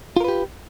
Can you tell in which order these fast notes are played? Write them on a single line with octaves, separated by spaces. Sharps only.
F4 A#4 B4 G4